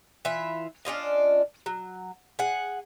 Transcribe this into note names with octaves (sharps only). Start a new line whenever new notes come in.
E3 F4 E5
C#4 D4 F4 D#5
F#3
G#4 F#5